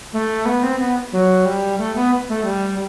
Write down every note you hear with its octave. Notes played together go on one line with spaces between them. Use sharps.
A3
B3
C4
B3
F#3
G3
A3
B3
A3
G3